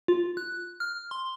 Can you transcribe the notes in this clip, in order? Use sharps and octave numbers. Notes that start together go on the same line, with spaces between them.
F4
F#6
F6
C6